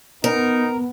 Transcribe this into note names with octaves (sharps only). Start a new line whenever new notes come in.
B3 D#4 A#4